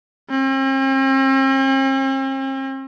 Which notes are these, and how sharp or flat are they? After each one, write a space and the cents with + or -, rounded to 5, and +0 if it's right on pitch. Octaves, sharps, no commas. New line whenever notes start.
C4 +45